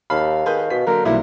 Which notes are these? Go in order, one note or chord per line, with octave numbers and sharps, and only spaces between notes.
D#2 F5 A5 B5
D#3 G#4 B4 G6
B2 B6
D3 F#3 A#3 A#4
B1 C3 E3 F#3 G3 A#3 E4